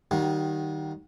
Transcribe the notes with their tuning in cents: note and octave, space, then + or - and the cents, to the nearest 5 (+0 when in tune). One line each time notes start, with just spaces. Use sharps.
D#3 +0 G3 -30 F#4 -30